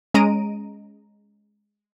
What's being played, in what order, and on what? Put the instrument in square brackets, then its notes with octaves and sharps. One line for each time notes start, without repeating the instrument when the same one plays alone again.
[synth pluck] G#3 C#4 D#5 A#5 D7 D#7